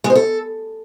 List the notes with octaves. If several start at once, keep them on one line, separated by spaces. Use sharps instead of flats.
G#3
C5
A4